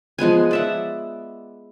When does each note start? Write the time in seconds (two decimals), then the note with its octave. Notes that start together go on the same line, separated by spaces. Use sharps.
0.19 F3 G#3 B3 G#5
0.51 D5 E5 F#5